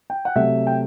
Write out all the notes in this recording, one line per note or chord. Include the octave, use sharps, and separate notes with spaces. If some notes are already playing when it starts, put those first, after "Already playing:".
G5
F#5
C3 F#3 A3 E5
G5